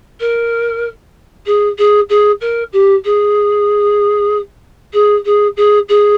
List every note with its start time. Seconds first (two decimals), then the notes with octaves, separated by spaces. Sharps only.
0.20 A#4
1.46 G#4
1.78 G#4
2.09 G#4
2.41 A#4
2.72 G4
3.05 G#4
4.93 G#4
5.25 G#4
5.57 G#4
5.89 G#4